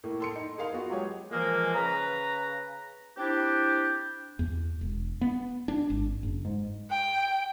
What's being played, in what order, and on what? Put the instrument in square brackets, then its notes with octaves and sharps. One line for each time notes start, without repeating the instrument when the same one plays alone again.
[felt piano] A2 A#3
A4 C6 C#7
D#4
G#4 A#4 F5 C6
B3 F4 F#4
F#3 G#3 G4 G#4 C#5
[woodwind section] A#2 E3 F3 G#3 A#3
C#3 B4 A#5
C4 D4 E4 G4
[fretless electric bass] E2
E1
B3
D4
G#1
F#1
G#2
[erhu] G5